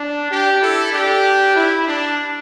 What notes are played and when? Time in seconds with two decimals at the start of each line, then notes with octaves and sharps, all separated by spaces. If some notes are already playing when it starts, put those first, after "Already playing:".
Already playing: D4
0.30 D4 G4
0.62 E4 A4
0.93 D4 G4
1.55 E4
1.87 D4